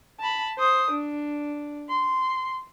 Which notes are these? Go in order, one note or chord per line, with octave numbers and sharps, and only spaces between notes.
A5 B5
C5 D#6
D4
C6